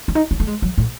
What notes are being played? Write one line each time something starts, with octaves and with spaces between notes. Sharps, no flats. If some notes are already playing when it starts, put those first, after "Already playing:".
C#4
D#4
C#4
A3
G#3
F#3
A2